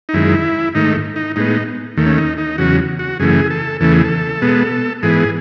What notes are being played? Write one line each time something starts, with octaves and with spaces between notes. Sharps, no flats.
D#4
F#2 D#3 G#3 E4
G#2 D#3 A3 D#4
D#4
A2 G#3 B3 D#4
D#2 D#3 A3
C#4
D#4
D#4
E2 C#3 F#3 F#4
F#4
F#2 C#3 E3 A3 G#4
A4
E2 C#3 E3 A3 A4
G#4
A4
B2 G#3 B3
G#2 E3 B3 G#4